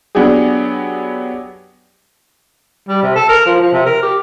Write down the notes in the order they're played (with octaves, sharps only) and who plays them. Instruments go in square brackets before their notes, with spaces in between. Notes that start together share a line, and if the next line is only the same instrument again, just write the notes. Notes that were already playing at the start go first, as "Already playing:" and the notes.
[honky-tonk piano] F#3 B3 D4 G4 G#4
[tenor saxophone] G3
C3
A4
A#4
F3
F3
C3
A#4
G4